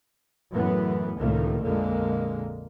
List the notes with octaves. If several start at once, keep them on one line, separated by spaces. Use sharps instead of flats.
F#2 A2 E3 B3
C#2 A2 C3 D#3 A3 A#3
A#1 F2 A#2 D3 G#3 A#3